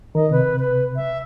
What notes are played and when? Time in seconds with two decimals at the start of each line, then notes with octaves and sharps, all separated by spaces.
0.15 D#3 A#4 D#5
0.31 C3 B4
0.59 B4
0.96 E5